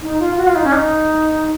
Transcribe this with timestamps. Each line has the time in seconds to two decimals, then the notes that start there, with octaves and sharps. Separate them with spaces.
0.01 D#4
0.19 F4
0.37 F#4
0.46 F4
0.55 D#4
0.63 C#4
0.72 D#4